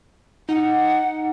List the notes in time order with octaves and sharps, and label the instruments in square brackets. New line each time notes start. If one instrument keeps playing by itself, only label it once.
[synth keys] D#4 [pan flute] F#5